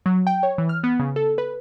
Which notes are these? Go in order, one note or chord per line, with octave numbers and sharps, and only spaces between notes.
F#3
G5
C#5
E3
F6
B3
C#3
A4
B4